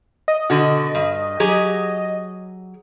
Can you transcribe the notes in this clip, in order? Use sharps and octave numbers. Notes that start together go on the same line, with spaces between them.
D#5
B2 D3 F#4
G2
F#3 G4 G#4